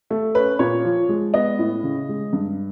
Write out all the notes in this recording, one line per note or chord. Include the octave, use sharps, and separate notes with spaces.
A3
C#4 B4
A#2 C#5
F3
G#3
B3 D#5
A2
C#3
G#3
G2